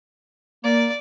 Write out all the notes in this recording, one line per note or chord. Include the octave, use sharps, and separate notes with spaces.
A#3 D5